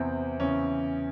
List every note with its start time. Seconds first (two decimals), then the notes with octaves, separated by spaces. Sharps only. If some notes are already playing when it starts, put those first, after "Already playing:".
Already playing: E2 C3 E3 C4
0.40 E2 C#3 E3 C#4